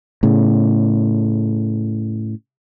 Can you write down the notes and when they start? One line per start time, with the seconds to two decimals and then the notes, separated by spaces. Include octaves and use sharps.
0.23 A2 C#3